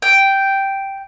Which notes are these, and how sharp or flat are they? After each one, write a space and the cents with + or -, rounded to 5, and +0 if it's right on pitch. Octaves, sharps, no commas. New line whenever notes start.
G5 -5